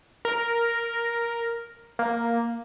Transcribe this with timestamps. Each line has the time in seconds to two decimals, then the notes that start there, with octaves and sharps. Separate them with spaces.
0.25 A#4
1.99 A#3